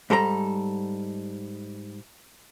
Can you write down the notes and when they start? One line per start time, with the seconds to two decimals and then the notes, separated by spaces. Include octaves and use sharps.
0.10 G#2 G3 A4 C5 A#5